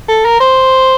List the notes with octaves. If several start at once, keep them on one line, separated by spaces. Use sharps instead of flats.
A4
A#4
C5